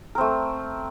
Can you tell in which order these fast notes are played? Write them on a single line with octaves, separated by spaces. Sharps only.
A#4 C4 A3